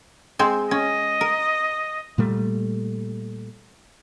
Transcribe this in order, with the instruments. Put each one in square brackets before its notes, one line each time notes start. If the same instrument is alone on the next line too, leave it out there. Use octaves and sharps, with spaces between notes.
[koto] G#3 C4 C5
[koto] C#4 [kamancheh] D#5
[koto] A#4
[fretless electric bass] A#2 G3 A3